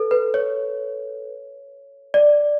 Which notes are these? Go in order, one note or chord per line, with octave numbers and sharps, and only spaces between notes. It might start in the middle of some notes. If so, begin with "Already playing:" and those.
Already playing: A4 B4
B4
C#5
D5